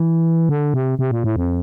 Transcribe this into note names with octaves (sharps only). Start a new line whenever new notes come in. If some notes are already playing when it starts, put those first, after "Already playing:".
Already playing: E3
D3
C3
C3
A#2
A2
F2